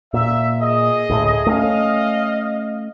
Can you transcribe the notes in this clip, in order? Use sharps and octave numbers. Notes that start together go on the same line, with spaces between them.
A#2 E5
G#4 D#5
D2 A2 A3
A3 C4 C#4 D#5 F5